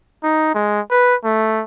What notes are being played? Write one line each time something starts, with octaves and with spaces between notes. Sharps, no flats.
D#4
G#3
B4
A3